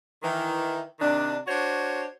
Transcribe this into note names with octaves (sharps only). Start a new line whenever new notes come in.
D#3 E3
C3 D#3 D4
D4 F#4 C5 C#5